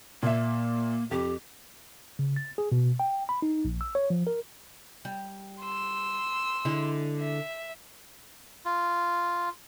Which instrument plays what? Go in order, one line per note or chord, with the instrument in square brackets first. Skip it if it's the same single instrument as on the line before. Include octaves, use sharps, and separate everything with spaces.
[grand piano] A#2 E5 [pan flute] A#3
[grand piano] F2 [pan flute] G4
[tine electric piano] C#3
A6
G#4
B2
G5
B5
D#4
A#1
E6
C#5
F3
A#4
[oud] G3
[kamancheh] C6 E6
[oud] D3 G#3 E4
[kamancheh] E5
[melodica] F4